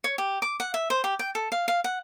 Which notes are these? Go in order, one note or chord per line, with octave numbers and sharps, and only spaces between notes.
C#5
G4
D6
F#5
E5
C5
G4
G5
A4
F5
F5
F#5